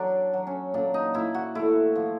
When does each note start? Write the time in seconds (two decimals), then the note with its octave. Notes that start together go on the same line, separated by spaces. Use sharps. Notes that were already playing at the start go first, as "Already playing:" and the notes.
Already playing: F#3 D4
0.33 F#3
0.47 C#4
0.74 A#2 D4
0.94 D#4
1.14 A#2 E4
1.34 F#4
1.55 A3 E4
1.95 F3